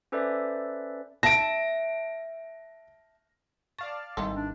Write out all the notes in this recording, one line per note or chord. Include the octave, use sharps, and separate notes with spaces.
C#4 A4 B4 C5 D5 E5
E5 A5 A#6 D7
D5 F5 A5 C#6
G#1 D#3 E3 G3 A4 C6
D4